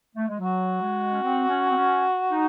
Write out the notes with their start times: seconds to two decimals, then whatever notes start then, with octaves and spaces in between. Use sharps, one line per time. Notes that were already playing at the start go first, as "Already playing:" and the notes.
0.16 A3
0.28 G#3
0.40 F#3 F#4
0.81 G#3
1.13 C#4
1.22 C4
1.49 C#4
1.68 C4
1.76 C#4
2.31 D#4